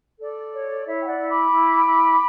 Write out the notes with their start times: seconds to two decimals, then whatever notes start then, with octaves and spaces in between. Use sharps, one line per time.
0.19 A4 D5
0.52 C#5
0.85 E4 C#5 E5
1.01 G5
1.06 D5 F#5
1.17 E4
1.28 B5 D6
1.50 E4
1.84 E4